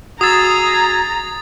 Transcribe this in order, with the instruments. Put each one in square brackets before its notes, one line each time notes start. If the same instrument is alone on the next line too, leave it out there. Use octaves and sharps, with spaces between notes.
[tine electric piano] F#4 E6 [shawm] G#4 [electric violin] A#5 [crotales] D#6 A6